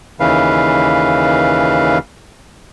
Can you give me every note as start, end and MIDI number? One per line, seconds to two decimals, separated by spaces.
0.20 1.98 39
0.20 1.98 49
0.20 1.98 52
0.20 1.98 71
0.20 1.98 77